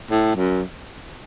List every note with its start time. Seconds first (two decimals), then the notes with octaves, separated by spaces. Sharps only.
0.10 A2
0.36 F#2